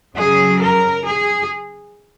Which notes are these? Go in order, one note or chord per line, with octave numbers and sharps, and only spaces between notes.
C#3 F#3 G#4
A#4
G#4